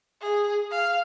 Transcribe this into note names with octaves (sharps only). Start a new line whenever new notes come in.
G#4
F5